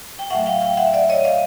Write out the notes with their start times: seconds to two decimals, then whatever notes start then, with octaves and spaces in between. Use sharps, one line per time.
0.19 G5
0.30 A2 F#3 A3 E5 F#5
0.46 F5 G5
0.61 F5 G5
0.77 E5 F#5
0.93 D5 E5
1.09 C#5 D#5
1.25 D#5 F5